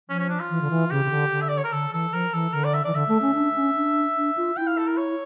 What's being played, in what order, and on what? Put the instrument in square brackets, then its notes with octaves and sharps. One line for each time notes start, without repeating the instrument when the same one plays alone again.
[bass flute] F3 [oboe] C#4
[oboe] C#4
D4
F4
[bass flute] E3
D3
E3
[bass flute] C#3 [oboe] G4
[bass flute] C#3
D3
D3
[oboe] E5
D5
C#5
A#4
[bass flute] D3 [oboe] A4
[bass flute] E3 [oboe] A4
[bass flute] F3 [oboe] A#4
[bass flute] E3 [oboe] A4
[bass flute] D3 [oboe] A#4
[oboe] D5
E5
[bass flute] E3 [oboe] D5
[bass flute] D3 [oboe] E5
[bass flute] A3
C#4
D4
C#4
D4
D4
F4
[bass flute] E4 [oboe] G5
[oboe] F5
A4
A#4
C#5